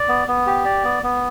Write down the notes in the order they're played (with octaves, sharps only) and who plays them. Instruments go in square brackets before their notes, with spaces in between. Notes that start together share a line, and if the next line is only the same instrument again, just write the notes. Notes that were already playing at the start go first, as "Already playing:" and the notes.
Already playing: [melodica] D5
B3
B3
G4
D5
B3
B3